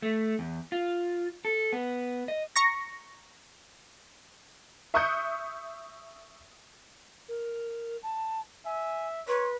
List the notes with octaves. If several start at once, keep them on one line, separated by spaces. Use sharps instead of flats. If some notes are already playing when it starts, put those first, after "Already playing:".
A3
E2
F4
A4
B3
D#5
A#5 C#6 A#6
E5 C#6 D#6 F#6 G6 C#7
A#4
A5
E5 G#5
B4 C#5 C6